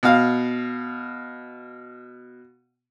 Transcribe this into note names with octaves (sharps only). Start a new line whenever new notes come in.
B2 F5